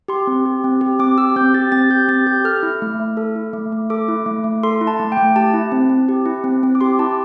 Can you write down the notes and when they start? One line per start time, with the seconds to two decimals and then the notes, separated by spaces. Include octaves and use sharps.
0.08 G4 C6
0.27 C4
0.45 G4
0.64 C4
0.81 G4
0.99 C4 D6
1.18 G4 E6
1.36 C4 G6
1.54 G4 A6
1.72 C4 A6
1.90 G4 G6
2.09 C4 A6
2.27 G4 G6
2.44 A4 F6
2.63 E4
2.82 A3
3.00 A3
3.17 A4
3.36 E4
3.53 A3
3.72 A3
3.90 A4 D6
4.08 E4
4.26 A3
4.44 A3
4.63 A4 C6
4.81 E4
4.87 A5
4.99 A3
5.12 G5
5.17 A3
5.36 G4 A5
5.54 E4
5.72 C4
5.89 C4
6.09 G4
6.26 E4
6.44 C4
6.63 C4
6.75 D6
6.81 G4 C6
6.99 E4 A5